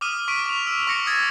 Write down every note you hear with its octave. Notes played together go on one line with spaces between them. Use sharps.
D6 D#6 F6 D#7
C#6 B6 D7 D#7
C#6 F7
E6
C#6 D6 A#6 C#7
D#6 E6 G#6 A6